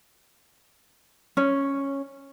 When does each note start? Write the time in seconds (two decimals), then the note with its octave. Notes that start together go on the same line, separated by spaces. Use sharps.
1.37 C#4